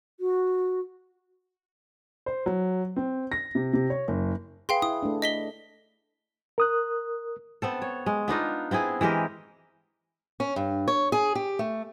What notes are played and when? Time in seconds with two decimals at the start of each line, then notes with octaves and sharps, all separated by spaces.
0.20 F#4
2.26 C5
2.46 F#3
2.96 C4
3.32 A#6
3.55 C3
3.73 C3
3.90 C#5
4.08 F#1
4.69 G#4 B4 F5 G5 C6
4.82 E4 D#6
5.03 A3 D4
5.22 D#5 B6 G7
6.58 A#4 D#6 F#6
7.62 B3 C4 A4
7.82 C#5
8.06 G#3
8.28 B3 D4 D#4 F4
8.71 B3 C4 E4 G#4
9.01 E3 G#3 G4 A#4
10.40 C#4
10.56 G2
10.88 C#5
11.12 G#4
11.35 G4
11.59 A3